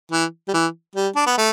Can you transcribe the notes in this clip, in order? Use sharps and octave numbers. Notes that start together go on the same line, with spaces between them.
E3
G3
E3
G3
D4
B3
A3